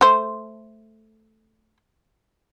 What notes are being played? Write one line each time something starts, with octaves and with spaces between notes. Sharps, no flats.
A3 C5